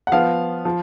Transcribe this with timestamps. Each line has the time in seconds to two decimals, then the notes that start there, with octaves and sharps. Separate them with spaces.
0.07 F#5
0.12 F3 B3 F5
0.65 F3